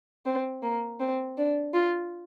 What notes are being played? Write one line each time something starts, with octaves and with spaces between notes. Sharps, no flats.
C4
A#3
C4
D4
F4